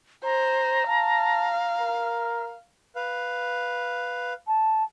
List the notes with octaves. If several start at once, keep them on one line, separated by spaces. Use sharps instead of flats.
C5 A#5
F5 A5
A#4
B4 F5
A5